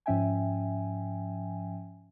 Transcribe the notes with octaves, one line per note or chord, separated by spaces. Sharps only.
G#2 F3 C#4 E5 G5 G#5